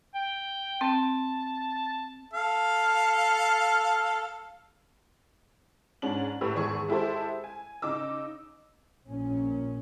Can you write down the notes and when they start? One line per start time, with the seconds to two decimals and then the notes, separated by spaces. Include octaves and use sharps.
0.14 G5
0.81 C4 A5
2.33 A4 F5
6.02 G#2 C#4 D4 F#7
6.41 A2 G4 B4 E6
6.55 G#1 E2 G#4 C#6
6.88 G#3 E4 G4 A4 C5
7.44 G#5
7.82 C#3 D#4 D6 E6
9.05 A#1 A#2 C#4